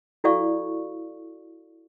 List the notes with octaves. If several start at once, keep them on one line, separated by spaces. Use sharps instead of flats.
E4 F#4 A4 D5 F5 C#6